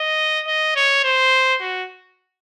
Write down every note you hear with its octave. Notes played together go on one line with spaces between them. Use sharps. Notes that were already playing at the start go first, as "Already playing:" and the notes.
Already playing: D#5
D#5
C#5
C5
F#4